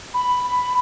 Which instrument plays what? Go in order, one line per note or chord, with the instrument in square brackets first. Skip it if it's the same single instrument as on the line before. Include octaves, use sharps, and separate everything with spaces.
[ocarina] B5